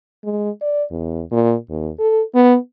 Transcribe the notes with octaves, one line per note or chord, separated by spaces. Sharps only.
G#3
D5
E2
A#2
D#2
A4
B3